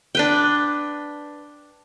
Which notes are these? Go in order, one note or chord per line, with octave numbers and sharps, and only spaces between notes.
D4 B4 G5